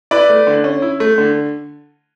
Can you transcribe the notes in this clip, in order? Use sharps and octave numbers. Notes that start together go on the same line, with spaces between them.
E4 B4 D5
A3
D3
C#4
E4
A3
D3